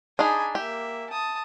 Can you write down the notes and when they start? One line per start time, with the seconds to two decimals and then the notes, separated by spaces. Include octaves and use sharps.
0.19 D4 D#4 G#4 G#5 B5
0.55 A#3 G4 E5
1.10 A5 D#6